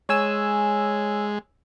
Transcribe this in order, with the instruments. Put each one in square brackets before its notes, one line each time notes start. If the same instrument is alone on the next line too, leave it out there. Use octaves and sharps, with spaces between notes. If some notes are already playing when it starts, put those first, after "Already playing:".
[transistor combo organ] G#3 [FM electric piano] C#5 G#5 E6